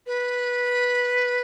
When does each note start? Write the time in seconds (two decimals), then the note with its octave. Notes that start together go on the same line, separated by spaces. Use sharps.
0.06 B4